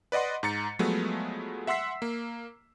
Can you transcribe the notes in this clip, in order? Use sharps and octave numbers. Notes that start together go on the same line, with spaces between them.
B4 D5 D#5 F#5 C6
G#2 A#5 A6 C#7
F3 F#3 G#3 A3 B3
E5 F#5 C6 E6 B6 C7
A#3